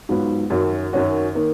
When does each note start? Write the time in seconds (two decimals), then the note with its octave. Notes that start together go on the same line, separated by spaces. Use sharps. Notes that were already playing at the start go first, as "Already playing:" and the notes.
0.09 G#2 F#3 B3 F4
0.50 F#2 D#3 F#3 C#4 F#4
0.93 F#2 D#3 F#3 C#4 F#4
1.35 D#3 A#3